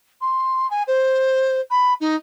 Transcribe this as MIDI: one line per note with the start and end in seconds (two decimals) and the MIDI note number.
0.21 0.69 84
0.70 0.83 80
0.87 1.61 72
1.71 1.94 83
2.01 2.16 63